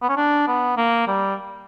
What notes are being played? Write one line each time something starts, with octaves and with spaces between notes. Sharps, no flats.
B3
C#4
D4
B3
A#3
G3